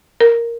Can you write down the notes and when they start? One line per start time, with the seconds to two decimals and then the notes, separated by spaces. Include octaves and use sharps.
0.21 A#4